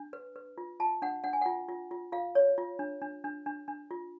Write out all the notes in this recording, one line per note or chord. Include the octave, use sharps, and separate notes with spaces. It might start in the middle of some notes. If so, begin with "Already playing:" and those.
Already playing: D4
B4
B4
F4
F4 A5
D4 F#5
D4 F#5
G#5
F4 F#5
F4
F4
F4 F5
C#5
F4
D4
D4
D4
D4
D4
F4